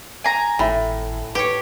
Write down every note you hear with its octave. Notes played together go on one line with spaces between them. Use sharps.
G#5 A#5
G#1 A2 E5 B5
G4 B4 C#5